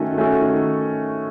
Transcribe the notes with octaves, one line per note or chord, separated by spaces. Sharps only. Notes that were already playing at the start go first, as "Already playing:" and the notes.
Already playing: D#3 A3 C#4 F#4 A4
A3 C#4 F#4 A4
D#3